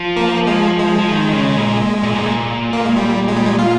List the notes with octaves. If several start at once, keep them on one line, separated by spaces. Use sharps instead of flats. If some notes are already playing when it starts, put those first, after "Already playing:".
Already playing: F3
A#3
G#3
G#3
F3
D#3
C#3
A#2
A#2
G#2
A#2
A#3
G#3
G3
G#3
G3
G#3
F4